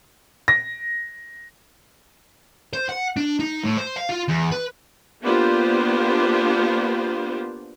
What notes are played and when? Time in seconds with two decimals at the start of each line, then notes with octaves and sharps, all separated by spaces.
0.48 A#6
2.73 C5
2.89 F#5
3.17 D4
3.40 D#4
3.64 A2
3.78 C5
3.97 F5
4.10 F4
4.29 E2
4.52 B4
5.23 A#3 B3 D4 F4 G4 C5